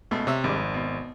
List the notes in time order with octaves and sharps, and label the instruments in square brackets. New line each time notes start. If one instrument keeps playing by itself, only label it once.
[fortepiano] C#2 B2 A3
[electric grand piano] C3 [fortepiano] C#5 E5
[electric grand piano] G#1 [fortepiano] G3 G#3 D4
[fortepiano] F2
B2